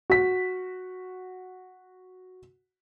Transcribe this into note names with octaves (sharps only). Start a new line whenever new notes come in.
F#4 B6